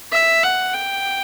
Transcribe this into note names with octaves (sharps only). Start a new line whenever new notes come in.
E5
F#5
G5